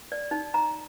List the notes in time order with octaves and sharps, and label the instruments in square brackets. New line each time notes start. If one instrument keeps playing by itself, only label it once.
[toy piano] D5
D#4
A#5